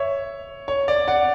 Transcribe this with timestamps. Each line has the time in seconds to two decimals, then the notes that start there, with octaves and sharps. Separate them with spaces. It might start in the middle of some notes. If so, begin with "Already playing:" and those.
Already playing: C#5 E5
0.68 C#5
0.88 D5
1.08 D5 F#5